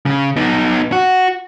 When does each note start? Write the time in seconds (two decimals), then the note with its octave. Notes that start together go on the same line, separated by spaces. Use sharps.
0.06 C#3
0.36 B3 D#4
0.92 F#4